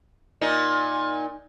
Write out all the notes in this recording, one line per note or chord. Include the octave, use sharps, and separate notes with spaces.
A#2 D#4